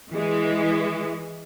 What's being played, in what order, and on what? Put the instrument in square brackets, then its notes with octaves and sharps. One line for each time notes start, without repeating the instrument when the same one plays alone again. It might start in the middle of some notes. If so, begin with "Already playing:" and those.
[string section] E3 G#3